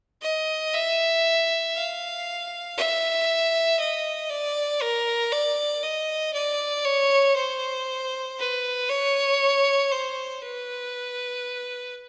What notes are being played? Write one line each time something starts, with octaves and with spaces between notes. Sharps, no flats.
D#5
E5
F5
E5
D#5
D5
A#4
D5
D#5
D5
C#5
C5
B4
C#5
C5
B4